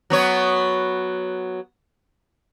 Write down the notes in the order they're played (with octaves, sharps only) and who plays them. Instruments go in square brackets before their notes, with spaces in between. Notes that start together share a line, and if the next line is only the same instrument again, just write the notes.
[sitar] F#3 B3 C#5